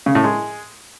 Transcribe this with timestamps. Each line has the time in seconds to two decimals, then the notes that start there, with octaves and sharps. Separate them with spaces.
0.06 C#3
0.15 A2
0.24 G#3